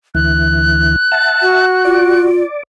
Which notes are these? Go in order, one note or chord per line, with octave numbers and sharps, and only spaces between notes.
D2 E3 F#6
E5 F#5 A5
F#4
F4 D5